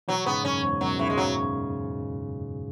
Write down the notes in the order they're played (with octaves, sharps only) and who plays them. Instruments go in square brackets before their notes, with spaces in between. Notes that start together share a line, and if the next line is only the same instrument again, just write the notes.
[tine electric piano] B2 E3 [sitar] F#3
[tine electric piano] G#2 C#3 [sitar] B3
[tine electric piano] F#2 [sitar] C#4
[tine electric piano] E2 G#2
[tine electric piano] F#2 B2 [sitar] F#3
[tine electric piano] G#2 C#3 [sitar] E3
[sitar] G#3
[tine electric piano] C#3 [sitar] F#3